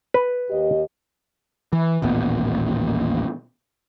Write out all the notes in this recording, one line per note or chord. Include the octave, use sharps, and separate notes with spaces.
B4
D#2 G4 D#5
E3
D#1 A1 A#2 B3